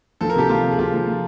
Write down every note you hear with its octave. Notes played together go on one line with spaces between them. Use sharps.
F3 A4
A#4
C3 G4 A4
F3 F4 G4
C3
G#4
C3 F4 G4
F3
F3